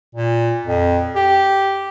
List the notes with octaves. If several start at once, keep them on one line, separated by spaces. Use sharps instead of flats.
A#2
F2
G4